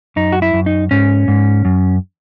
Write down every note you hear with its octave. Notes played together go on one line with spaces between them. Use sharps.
F#2 D#4
F#4
E4
F#2
D#4
G#2 C#4
G#2
F#2